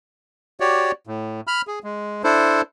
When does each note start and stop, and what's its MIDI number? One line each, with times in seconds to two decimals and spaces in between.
0.60 0.92 66
0.60 0.92 67
0.60 0.92 73
0.60 0.92 74
1.07 1.41 45
1.47 1.62 83
1.47 1.62 89
1.67 1.79 68
1.84 2.22 56
2.24 2.61 62
2.24 2.61 64
2.24 2.61 69
2.24 2.61 72